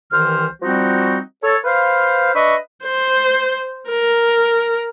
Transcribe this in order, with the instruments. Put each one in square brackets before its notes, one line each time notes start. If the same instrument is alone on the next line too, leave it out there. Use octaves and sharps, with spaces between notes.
[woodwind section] C2 D#3 E3 C5 F6
F3 G3 C4 D#4 F#4
A4 C#5
B4 C5 F5
D4 B4 D#5 E5 B5 C#6
[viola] C5
A#4